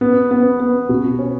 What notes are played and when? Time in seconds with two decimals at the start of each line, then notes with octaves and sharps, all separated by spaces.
0.01 B3
0.31 B3
0.60 B3
0.89 B2
1.19 C#4